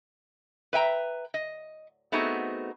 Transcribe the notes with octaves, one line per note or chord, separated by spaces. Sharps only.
B4 E5 G5 A#5
D#5
A3 B3 C4 D#4 F#4 G#4